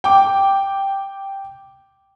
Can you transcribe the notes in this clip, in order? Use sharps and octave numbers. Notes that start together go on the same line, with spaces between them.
G5 D6